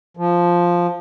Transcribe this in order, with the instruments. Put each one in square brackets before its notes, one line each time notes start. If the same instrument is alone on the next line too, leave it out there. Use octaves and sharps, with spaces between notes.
[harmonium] F3